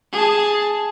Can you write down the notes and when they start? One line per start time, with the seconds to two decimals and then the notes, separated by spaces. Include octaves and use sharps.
0.12 G#4 A5